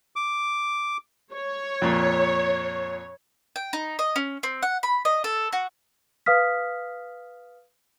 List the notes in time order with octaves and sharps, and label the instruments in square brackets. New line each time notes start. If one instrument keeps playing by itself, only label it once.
[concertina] D6
[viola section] C#5
[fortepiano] F2 A#2
[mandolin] G5
D#4
D#5
C#4
C4
F#5
B5
D#5
A4
F#4
[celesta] B4 F5 D#6 F6 B6